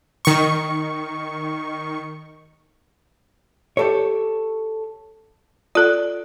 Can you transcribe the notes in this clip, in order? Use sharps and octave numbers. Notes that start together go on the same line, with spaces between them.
D#3 C#6
G4 A4 C#5
F4 A4 D5